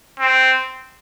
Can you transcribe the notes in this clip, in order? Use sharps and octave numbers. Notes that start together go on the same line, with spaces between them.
C4